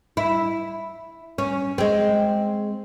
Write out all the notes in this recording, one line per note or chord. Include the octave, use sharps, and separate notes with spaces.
E4
C#4
G#3 C4